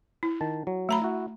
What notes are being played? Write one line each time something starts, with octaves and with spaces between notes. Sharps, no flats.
E4
D#3 A5
F#3
A3 A#5 B5
E4 F#4